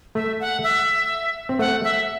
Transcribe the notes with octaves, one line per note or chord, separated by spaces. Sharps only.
A3 E5
F#5
E5
C4
A3 F#5
E5